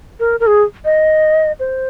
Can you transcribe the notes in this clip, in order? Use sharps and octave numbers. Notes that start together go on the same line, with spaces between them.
A#4
A#4
G#4
D#5
C5